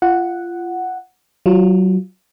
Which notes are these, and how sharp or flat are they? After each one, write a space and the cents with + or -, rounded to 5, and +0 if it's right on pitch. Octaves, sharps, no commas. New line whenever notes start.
F4 -25 F#5 +0
F#3 +20 F4 -5